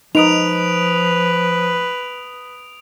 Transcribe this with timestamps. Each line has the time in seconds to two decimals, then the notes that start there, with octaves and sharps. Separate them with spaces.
0.15 F3 D#4 B4 D#6 D7 F7